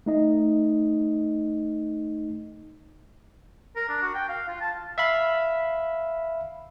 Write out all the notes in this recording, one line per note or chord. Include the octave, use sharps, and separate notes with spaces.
A3 D#4 D#5
A#4
D4
F#4
G5
F5
F4
A5
E5 F5 B5